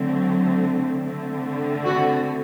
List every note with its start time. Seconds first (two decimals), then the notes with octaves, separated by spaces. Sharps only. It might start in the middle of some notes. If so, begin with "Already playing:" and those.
Already playing: D3 F#3 A3 C4
1.06 D3 A3 C4
1.85 F#4